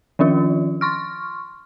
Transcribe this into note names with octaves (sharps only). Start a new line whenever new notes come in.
D#3 F3 C#4 F4
C6 C#6 F6